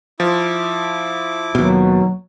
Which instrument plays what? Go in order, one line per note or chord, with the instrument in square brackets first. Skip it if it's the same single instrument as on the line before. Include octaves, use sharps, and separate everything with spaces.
[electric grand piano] F3 [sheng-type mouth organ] E4 D6
[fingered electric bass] D#2 B2 [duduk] F#3